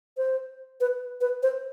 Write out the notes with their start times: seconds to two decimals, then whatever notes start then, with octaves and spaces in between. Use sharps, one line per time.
0.17 C5
0.81 B4
1.21 B4
1.43 C5